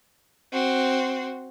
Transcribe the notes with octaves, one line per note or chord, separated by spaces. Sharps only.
C4 F#4